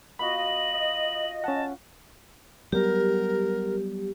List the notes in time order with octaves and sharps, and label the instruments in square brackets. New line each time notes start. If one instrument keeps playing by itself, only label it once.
[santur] B3 F4 F#4 [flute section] D#5 [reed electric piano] B5 [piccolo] F#7
[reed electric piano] C#4 F#5 [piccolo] A5
[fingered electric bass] F#3 G3 B3 [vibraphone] G4 [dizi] A#4